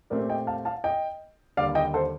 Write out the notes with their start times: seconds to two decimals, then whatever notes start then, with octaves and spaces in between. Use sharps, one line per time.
0.10 A#2 A3 C4 G4 A#4 D5
0.29 D#5 G5
0.47 F5 A5
0.65 F5 A5
0.84 D#5 G5
1.57 D#2 D3 G3 D5 F5
1.75 D#5 G5
1.94 A4 C5